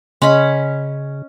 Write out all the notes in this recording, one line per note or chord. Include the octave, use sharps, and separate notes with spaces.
C#3 C#4 D#5 B5 C6